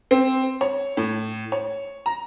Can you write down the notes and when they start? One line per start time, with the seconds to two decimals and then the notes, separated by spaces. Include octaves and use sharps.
0.11 C4
0.61 C#5
0.97 A2
1.52 C#5
2.06 A#5